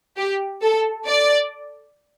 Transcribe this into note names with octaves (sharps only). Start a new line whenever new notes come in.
G4
A4
D5